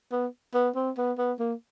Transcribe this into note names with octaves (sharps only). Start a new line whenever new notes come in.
B3
B3
C4
B3
B3
A#3